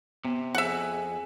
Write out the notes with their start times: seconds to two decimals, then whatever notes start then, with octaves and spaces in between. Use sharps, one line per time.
0.25 C3 B3
0.55 F2 G#4 E5 F#5